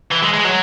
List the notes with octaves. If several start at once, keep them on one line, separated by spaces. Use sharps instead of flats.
E3
G#3
G#3
F#3